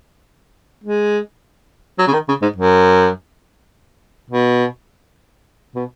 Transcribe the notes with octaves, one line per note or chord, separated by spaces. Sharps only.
G#3
F#3
C#3
D#3
C#3
G#2
F#2
B2
B2